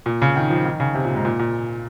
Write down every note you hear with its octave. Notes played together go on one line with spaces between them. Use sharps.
A#2
C#3
D#3
F3
D#3
C#3
C3
A#2
G#2
A#2
A#2